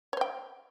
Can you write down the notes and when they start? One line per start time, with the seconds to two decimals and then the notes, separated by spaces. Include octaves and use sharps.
0.13 C#5
0.17 C5
0.21 G5